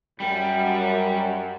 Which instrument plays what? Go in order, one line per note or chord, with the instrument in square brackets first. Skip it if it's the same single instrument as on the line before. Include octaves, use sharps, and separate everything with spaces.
[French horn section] F#2 [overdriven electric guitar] G3